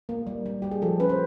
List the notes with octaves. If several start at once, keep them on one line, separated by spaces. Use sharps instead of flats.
A#3
G3
G3
G3 G4
G#4
F3 A4
C#4 B4
C5